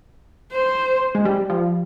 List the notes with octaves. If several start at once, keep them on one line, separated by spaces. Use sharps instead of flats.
C5
G#3
G3
F3